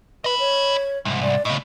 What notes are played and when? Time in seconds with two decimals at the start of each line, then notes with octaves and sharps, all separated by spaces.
0.24 B4 D#5 B5
0.39 C#5
1.05 C2 G#2
1.22 D5
1.45 A2 C#3 D#5